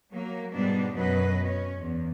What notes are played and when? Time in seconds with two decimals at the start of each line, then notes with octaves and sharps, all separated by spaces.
0.12 F#3 A#3
0.53 G#2 B2 G3 G#3 B3 D4
0.93 F#2 B2 F#3 B4 D#5
1.45 C#4
1.79 E2